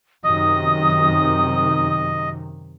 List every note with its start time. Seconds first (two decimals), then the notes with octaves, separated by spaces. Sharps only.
0.24 F#2 C3 D#3 D#5 D#6